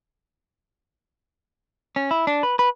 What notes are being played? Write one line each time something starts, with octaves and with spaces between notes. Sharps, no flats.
C#4
E4
D4
B4
B4